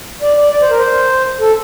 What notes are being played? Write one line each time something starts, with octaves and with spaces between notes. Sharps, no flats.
D5
D5
D5
C5
A#4
C5
A4